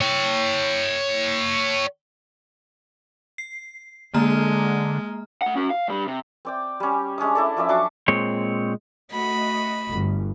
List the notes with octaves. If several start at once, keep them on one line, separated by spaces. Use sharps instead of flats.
C#5 G5
C7
D3 G#3 A#3 A#5 F6
A3 F#5
C#4 F#4
F5
G2 G3
C3
C4 D5 G5
G3 C#4
G#3 C#4 D4 D#6
E4 A4 D5
F3 C#4 D5 E5
F#3 D4 C#6 D6
A#2 G#3 C4 C#5
A3 F#4 D#5 B5
G1